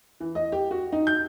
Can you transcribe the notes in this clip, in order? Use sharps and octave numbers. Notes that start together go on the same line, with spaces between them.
E3
D#5
G4
F#4
D#4
G6